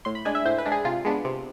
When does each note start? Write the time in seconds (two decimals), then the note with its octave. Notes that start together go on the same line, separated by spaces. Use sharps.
0.05 A2 C6
0.15 B5
0.25 G#3 D4 G#5
0.35 E5
0.45 A2 C5
0.58 B4
0.66 G#3 D4
0.72 G#4
0.85 C3 F4
1.05 G#3 B3 D4
1.25 C3